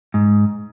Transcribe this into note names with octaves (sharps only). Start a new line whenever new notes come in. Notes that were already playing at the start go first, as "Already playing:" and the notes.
G#2